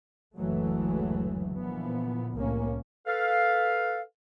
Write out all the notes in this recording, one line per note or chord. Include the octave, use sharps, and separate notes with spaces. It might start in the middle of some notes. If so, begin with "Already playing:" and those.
F#1 D2 E3 F#3 G#3 A3
A#2 D3 E3 F3 B3
C2 A2 A#3 C#4
A4 B4 F5